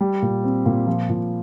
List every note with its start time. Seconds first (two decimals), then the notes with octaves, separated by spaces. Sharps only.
0.01 G3
0.22 A#2
0.44 C4
0.66 A#2
0.87 F3
1.09 A#2